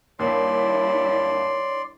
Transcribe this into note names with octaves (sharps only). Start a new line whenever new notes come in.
D#2 G3 D4 E4 C#5 D5 C6